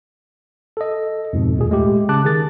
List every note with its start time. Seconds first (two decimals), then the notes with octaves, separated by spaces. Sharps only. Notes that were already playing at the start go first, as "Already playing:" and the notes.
0.77 A4 D#5
1.33 F2 G#2 B2
1.56 D#2 A#2 G#4
1.71 G#3 A3 G4
2.09 C#3 A5 D6 F#6
2.24 D#3 G#4 A6